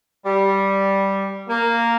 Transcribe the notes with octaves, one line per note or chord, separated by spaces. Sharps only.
G3
A#3